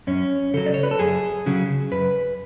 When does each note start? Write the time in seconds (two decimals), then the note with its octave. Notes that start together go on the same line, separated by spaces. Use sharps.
0.07 F#2 C#4
0.54 C#3 F#3 A4
0.66 D5
0.74 C#5
0.83 B4
0.91 A4
0.99 F#2 G#4
1.46 C#3 F#3
1.92 F#2 B4